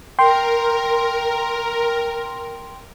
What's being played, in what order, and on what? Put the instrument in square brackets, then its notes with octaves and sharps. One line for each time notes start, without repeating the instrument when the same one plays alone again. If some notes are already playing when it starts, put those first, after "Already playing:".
[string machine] A#4 [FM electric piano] G5 C6